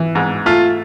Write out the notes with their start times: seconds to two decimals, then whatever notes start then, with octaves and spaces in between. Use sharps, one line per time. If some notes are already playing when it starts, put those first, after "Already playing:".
Already playing: E3
0.15 G#2
0.46 A3 F4